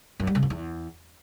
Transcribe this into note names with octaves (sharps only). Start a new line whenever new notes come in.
F#2
G3
C#3
F#2
E2